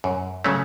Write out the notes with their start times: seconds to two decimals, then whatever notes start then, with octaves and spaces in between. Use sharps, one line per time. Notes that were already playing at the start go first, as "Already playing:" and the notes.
0.04 F#2
0.44 C#3 F#3 A3 C#4